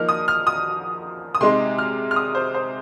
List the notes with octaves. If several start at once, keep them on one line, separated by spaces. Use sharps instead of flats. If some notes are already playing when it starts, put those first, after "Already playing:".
Already playing: F3 A#3 D#4 F6
D#6
F6
D#6
D#6
C3 G#3 D#4 C6
F6
F6
D#6
C5
C5